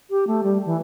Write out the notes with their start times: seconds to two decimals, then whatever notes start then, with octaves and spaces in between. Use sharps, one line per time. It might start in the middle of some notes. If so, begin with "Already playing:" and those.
0.10 G4
0.27 A3
0.43 G3
0.65 E3